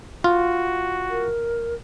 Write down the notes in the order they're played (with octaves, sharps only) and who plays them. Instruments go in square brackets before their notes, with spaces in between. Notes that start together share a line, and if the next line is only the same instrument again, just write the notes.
[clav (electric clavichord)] F4 [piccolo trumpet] F#4
[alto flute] A#4